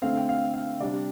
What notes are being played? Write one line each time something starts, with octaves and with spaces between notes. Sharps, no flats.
D3 A3 C4 F5
G5
F5
F5
C3 G3 D4 D5